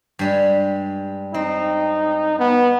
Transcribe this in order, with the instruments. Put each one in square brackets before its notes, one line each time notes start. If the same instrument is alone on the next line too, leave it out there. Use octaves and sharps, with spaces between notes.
[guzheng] G2 G3 G#3
[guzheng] C4 [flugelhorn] D#4
[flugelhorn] B3